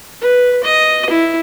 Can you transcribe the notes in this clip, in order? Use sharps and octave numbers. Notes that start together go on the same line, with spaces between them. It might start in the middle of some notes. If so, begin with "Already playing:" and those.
B4
D#5
E4